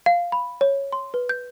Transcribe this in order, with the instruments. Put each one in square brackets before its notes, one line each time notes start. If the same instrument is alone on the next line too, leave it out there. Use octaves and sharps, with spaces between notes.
[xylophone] F5
B5
C#5
C6
B4
G6